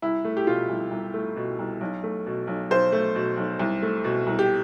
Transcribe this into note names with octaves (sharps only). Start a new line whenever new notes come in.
C2 E4
A3
G4
B2 F4
C2
C2
A3
B2
C2
B1
A3
B2
B1
B1 C5
A3
B2
B1
C2
A3
B2
C2
G4